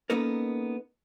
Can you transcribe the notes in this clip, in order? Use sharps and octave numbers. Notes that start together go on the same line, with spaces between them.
A#3 B3 C#4 D#4 A4 A#4